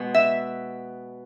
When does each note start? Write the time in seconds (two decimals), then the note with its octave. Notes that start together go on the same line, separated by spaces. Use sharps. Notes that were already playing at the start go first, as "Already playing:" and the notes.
Already playing: B2 G#3 B3
0.14 E5